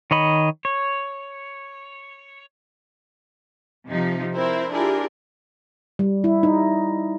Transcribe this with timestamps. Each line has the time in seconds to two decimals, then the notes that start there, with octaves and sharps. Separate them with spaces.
0.11 D#3 C#5 D#5 B5
0.65 C#5
3.88 C3 F3 D#4
4.33 C4 E4 A#4 C5
4.71 D4 E4 F4 G4 G#4 A#4
5.99 G3
6.24 E4
6.43 D#4